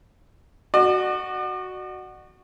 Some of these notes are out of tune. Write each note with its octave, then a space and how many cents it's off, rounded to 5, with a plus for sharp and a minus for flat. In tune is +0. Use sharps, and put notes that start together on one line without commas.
F#4 +0 D5 +45